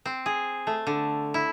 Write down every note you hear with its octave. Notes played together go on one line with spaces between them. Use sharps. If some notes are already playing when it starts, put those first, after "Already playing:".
C4
G#4
A3
D3
E4